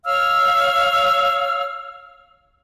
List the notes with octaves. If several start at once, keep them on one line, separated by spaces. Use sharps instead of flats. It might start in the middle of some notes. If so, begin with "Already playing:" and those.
C#5 F5 E6 F6